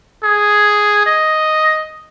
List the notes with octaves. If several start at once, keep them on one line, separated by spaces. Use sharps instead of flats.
G#4
D#5